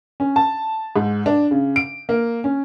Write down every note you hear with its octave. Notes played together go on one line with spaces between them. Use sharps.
C#4
A5
G#2
D4
C#3
D7
A#3
C#4